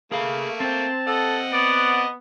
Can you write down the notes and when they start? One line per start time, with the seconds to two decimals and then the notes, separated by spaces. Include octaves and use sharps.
0.12 A3 A#3 G#4 F5
0.60 C4 C5 A5
1.08 A4 D#5 F#5
1.53 B3 D5